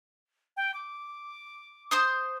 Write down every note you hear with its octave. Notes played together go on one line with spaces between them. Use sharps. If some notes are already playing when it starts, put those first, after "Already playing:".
G5
D6
C5 C6 D#6